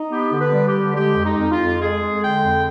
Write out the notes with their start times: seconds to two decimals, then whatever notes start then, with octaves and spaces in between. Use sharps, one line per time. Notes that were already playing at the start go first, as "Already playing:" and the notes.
Already playing: D#4
0.10 B3 G4
0.31 D3
0.39 B4
0.53 G3
0.66 G4
0.74 D3
0.95 G#3 G4
1.16 F2
1.23 D#4
1.37 F2
1.51 F4
1.58 F2
1.80 G#3 G#4
2.01 G#3
2.22 D3 G5
2.43 F2